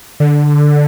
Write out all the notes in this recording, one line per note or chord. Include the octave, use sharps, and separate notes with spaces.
D3